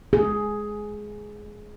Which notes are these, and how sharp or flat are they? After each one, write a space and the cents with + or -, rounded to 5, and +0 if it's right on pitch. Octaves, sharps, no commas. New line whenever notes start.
G#4 +10